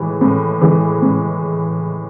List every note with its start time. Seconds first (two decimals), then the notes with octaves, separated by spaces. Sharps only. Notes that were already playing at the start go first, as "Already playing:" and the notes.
Already playing: A2 E3 G#3
0.21 A2
0.62 E3 G#3
1.02 A2